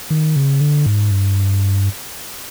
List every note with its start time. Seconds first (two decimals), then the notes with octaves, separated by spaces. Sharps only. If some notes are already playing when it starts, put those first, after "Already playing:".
0.10 D#3
0.36 C#3
0.61 D3
0.86 G#2
1.11 G2